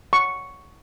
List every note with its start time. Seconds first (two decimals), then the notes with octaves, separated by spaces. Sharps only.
0.13 C#6